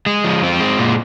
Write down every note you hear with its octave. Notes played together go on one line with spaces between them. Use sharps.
G#3
F3
C4
G#3
A#2